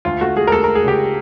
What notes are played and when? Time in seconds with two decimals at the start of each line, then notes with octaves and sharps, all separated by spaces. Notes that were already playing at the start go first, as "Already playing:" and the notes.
0.05 D2 F4
0.21 A3 F#4
0.37 A3 G#4
0.47 A#4
0.52 A3 A4
0.64 A#4
0.68 A3
0.75 G#4
0.84 C#3 G4